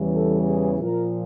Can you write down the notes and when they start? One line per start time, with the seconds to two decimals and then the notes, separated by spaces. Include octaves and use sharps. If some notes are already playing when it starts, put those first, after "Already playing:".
Already playing: E2 C#3 E3 G3
0.15 A4
0.49 G#4
0.80 A#2 F3 A#4